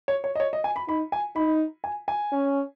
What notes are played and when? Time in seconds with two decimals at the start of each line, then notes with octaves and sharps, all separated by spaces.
0.08 C#5
0.24 C#5
0.35 D#5
0.40 C#5
0.53 D#5
0.64 G#5
0.76 B5
0.88 D#4 B5
1.12 G#5
1.36 D#4 B5
1.84 G#5
2.08 G#5
2.32 C#4